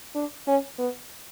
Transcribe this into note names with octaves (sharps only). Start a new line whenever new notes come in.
D4
C#4
B3